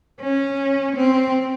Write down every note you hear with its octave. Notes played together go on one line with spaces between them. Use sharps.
C#4
C4